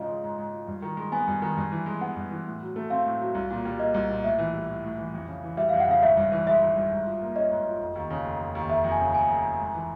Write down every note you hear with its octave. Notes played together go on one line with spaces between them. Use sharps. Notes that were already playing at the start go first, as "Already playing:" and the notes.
Already playing: G#2 C#3 F3 D#5
G#3
G#2
G#2
F3
G2
D#3
G#3
B3 G#5
G2
D#3
G2
E3
G#3
B3 F#5
G2
E3
A2
F#3
A3
C4 F5
A2
F#3
C2
A#2
G3
A#3 D#5
C2
A#2
A2 E5
E3
G3
A2
A2
E3
F2
C#3
E3
G3 E5
F2 F5
F#5
C#3 F5
G#1 E5
G2
E3
G#3 E5
G#1
G2
G#2
F3
A#3
C#4 D#5
G#2
F3
F1
D#2
C#3
F1
F1
D#2
F1 E5
F2
G#5
C#3
F1 G#5
F1
F2
G#2
E3